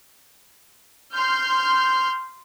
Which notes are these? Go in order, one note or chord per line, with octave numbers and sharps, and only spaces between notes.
C6 F6 G6